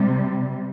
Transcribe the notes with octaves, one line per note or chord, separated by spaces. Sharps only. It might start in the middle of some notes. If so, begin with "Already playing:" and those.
Already playing: C3 G3